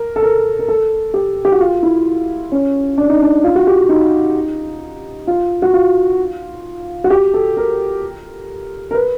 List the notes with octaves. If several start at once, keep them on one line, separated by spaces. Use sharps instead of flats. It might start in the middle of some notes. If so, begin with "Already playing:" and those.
Already playing: A#4
A4
A#4
A#4
A4
G4
G4
F#4
F4
E4
C#4
D4
D#4
D4
F4
F#4
G4
D#4
F4
F#4
F4
F#4
G4
A4
A#4
A#4
B4